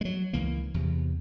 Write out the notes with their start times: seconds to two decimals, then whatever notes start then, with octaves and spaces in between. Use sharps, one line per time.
0.01 F#3 G#3
0.33 C#2 E3 A#3
0.74 E2 C3